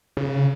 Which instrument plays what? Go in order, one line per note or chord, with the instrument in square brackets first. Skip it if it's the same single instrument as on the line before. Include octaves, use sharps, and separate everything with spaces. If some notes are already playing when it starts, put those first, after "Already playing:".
[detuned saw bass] C#3